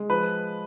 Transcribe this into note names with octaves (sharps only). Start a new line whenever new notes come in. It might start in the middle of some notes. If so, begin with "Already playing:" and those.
Already playing: G#3
F3 B4